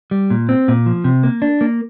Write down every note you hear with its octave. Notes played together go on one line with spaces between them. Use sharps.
G3
A#2
C4
A#2
F3
C3
A#3
D4
A#3